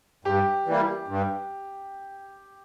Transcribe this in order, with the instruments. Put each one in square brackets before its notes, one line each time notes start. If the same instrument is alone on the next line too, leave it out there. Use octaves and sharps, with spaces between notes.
[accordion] G2 [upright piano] G4
[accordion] E3 G3 A#3
G2